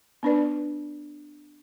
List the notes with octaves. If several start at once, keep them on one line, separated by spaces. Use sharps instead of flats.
B3 D4 B4 D5